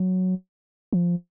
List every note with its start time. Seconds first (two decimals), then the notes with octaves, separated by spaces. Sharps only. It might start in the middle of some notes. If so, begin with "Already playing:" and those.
Already playing: F#3
0.93 F3